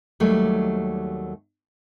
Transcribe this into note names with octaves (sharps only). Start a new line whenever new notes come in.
D#2 F#3 G3 A3